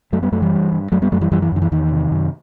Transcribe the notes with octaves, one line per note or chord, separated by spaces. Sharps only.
F#2 F#3 A3
G3 B3
F#2 F#3 A3
E3 G3
G2
G2
F#2 F#3 A3
G3 B3
F#2 F#3 A3
E3 G3
F#2 E3 G3
E3
F#2 D#3
E3
E2 D#3
C3
F#2